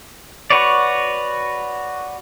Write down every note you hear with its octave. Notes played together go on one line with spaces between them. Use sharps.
F#4 B4 C#5 D5